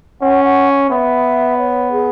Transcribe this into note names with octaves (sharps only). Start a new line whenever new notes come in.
C#4 F#5
F#5
B3 E5
C#5
G#4